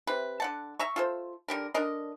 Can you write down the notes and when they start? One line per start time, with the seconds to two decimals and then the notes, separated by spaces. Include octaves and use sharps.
0.07 C3 B4
0.40 D3 F#5 A5
0.79 E5 A#5 C#6
0.96 F4 A4 C5
1.48 D3 G3 A#4
1.74 D3 D4 A#4 D#5